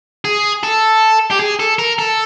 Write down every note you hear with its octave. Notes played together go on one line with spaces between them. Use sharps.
G#4
A4
G4
G#4
A4
A#4
A4